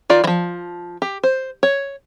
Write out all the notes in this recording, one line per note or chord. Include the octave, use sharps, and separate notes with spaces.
D#3 F4 D5
E3 F3
G4
C5
C#5